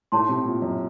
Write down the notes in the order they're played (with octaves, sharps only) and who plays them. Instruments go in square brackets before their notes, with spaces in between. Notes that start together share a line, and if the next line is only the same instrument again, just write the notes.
[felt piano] A2 [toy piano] D#4 A4 C#5 A5 C6
[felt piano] C3
A#2
F#2